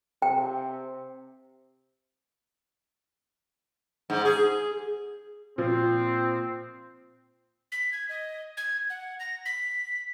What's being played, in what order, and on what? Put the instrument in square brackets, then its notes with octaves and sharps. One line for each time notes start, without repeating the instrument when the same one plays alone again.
[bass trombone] C3 [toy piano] G5
[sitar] G#2
G#4
[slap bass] A#2 [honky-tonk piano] F3 [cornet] C4
[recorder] B6
G#6
D#5
G#6
F#5
A#6
B6